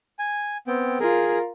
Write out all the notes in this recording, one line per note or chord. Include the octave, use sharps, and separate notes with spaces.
G#5
B3 C4 G5
F4 G#4 A#4